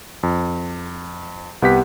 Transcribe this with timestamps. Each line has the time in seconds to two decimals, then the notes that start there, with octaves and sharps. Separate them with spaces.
0.23 F2
1.62 C2 B3 G4 F#5 B6